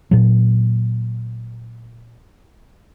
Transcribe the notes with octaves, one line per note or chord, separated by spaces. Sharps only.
A#2 F#3